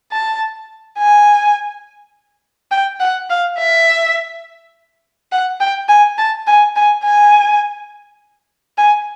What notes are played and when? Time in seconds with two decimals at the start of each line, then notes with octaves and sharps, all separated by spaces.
0.12 A5
0.98 G#5
2.72 G5
3.00 F#5
3.30 F5
3.58 E5
5.32 F#5
5.60 G5
5.89 G#5
6.18 A5
6.47 G#5
6.76 G#5
7.04 G#5
8.78 G#5